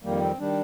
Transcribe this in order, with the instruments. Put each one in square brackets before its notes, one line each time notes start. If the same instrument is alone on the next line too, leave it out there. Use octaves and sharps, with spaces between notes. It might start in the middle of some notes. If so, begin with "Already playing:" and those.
[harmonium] F2 D#3 G3 A#3
C4
D#3 G3 D4